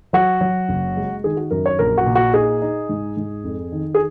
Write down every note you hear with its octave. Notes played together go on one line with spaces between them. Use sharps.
F#3 F#4
F#3
F#1
G#3
D#3 G#4
F#4
F#2 A#4
C#5
A#1 A#4
F#4
A#2
F#4
D#4 G#4
D#4
G#2
G#2
F2
D#3
G#4